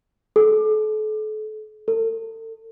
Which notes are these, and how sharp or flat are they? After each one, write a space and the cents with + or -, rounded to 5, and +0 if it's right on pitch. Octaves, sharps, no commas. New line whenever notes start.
A4 -40
A4 +35